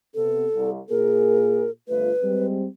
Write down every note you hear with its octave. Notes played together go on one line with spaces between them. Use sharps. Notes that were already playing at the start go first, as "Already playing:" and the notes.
C3 B3 A4
C2
A#2 A#3 G#4 A#4
G1 A3 F4 B4
G3 G#3 C4